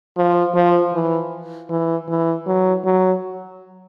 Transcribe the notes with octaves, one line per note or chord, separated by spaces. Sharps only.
F3
F3
E3
E3
E3
F#3
F#3